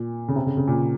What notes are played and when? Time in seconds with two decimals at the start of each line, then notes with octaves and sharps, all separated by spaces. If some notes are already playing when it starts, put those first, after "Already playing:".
Already playing: A#2
0.28 C#3
0.36 C3
0.46 C#3
0.57 C#3
0.68 A#2